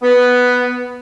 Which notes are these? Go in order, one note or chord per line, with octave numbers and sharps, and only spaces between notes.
B3